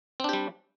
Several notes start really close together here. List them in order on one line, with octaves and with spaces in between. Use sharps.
C4 D4 G4 G3